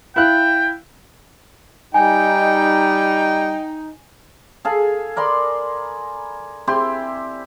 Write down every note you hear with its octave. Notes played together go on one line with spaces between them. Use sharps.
E4 F5 G5 F#6
G3 D#4 G5 G#5
G#4 A4 F5
A#4 D5 B5 C6
C4 E4 G4 C6